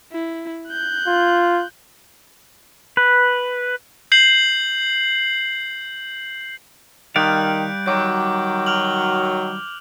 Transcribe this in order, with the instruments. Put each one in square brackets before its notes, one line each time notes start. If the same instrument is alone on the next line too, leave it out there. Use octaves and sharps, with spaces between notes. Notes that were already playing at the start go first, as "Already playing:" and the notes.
[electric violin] E4
F#6 G6
[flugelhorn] F4
[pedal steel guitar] B4
[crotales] G6 C7 F#7
[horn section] D#3 [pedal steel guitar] G3 D5 F5 [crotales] F#6 G6 D7
[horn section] D#3 F#3 [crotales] D6 G6
[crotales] F6 F7 F#7